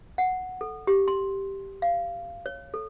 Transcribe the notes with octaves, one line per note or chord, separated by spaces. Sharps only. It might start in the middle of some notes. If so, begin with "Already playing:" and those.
F#5
A4
G4
C6
F5
C#5
A4